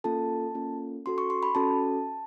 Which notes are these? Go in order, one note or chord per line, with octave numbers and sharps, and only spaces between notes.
A#3 C#4 F4 A4 A5
A#3 C#4 F4 A4
C#4 F#4 A4 C6
C#6
C6
B5
C#4 F#4 A4 A5